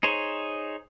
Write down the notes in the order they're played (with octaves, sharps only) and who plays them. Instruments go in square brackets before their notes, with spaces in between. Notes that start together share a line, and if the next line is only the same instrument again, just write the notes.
[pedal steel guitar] D#4 G#4 C5 C#5